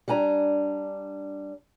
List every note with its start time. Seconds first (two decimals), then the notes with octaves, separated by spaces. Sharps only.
0.08 G3 D4 G#5 A#5